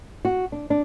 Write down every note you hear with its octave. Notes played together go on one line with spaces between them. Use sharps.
F#4
D4
D4